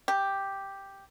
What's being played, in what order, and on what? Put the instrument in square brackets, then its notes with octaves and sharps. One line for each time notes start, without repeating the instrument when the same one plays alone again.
[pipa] G4